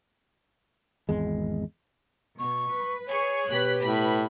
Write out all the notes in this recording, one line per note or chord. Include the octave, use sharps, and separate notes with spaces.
G#1 E2 G#3
B2 C#6
B4
G#4 C#5 C#6
B2 G4 B4 F#6 B6
A2 B5